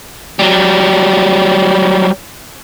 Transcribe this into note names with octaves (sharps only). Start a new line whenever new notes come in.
F#3 G3